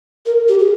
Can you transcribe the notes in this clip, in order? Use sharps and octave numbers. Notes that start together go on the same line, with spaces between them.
A#4
G4
G#4